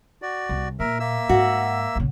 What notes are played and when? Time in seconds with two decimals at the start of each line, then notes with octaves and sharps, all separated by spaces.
0.22 F#4 D5
0.49 C2
0.80 A#2 A#4 E5
1.00 A#3 E5 E6
1.29 G#2 F#4
1.95 A#1 C#3